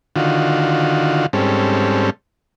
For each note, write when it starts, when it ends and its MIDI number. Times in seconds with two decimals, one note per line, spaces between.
0.16 1.26 50
0.16 1.26 51
0.16 1.26 65
0.16 1.26 66
1.33 2.10 44
1.33 2.10 55
1.33 2.10 60
1.33 2.10 61
1.33 2.10 69